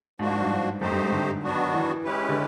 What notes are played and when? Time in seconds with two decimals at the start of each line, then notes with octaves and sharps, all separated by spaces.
0.19 G#2 F3 A#3 D4 F#4
0.30 G#2
0.41 G2
0.81 F#2 A3 C4 D#4 G4 C5
0.91 G2
1.02 G#2
1.12 D3
1.43 D#3 F#3 B3 D4 F#4
1.74 E3
2.04 G#3 C#4 E4 G4 B4
2.29 D3